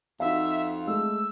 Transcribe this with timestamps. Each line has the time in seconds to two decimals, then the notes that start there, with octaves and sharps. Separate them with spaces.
0.20 F2 D#4 F#4 E5 F5
0.87 G#3 A3 A4 E6